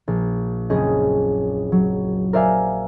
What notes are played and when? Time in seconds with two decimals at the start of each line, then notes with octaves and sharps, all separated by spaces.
0.08 A#1
0.70 F#1 C4 C#4 G#4 D#5
1.72 F#3
2.33 A#4 C5 D5 E5 F5 G#5